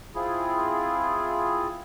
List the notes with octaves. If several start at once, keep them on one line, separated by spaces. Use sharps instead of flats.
C4 E4 F4 G#4